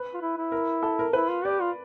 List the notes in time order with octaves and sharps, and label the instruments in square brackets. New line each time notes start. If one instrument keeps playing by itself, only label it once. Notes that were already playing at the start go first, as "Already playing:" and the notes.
Already playing: [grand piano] B4
[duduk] F4
E4
E4
[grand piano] A#4
A4
A#4
[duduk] E4 [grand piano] B4
[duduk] F4
[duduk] G4 [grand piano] D5
[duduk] F4